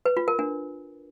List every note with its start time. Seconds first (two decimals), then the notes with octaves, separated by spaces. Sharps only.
0.05 B4
0.17 F4
0.28 A#4
0.39 D4